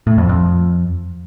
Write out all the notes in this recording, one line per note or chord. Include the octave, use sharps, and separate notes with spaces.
A2
F2
F2